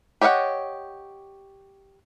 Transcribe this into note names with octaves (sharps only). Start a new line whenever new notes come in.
G4 C#5 D#5 F5 F#5